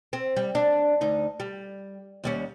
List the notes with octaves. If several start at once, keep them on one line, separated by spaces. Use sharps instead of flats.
C4
G3
D4
D2 D#4
G3
D#2 G3 C#4